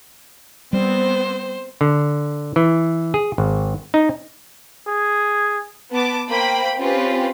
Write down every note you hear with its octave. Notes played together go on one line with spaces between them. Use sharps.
G3 B3 C4 C5
D3
E3
G#4
G#1
D#4
G#4
B3 A5 D6
A#3 C5 G5 B5
C4 C#4 F4 G4 B4